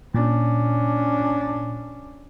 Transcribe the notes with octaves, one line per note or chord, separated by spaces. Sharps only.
A#2 C#4 D4